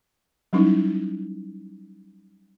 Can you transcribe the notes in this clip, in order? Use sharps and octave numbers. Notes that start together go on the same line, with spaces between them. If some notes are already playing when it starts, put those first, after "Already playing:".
F#3 G3 C#4 D#4 E4